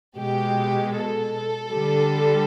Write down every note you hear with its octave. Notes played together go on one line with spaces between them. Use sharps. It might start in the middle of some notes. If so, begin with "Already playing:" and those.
B2 G#3 G4
A4
D3 G3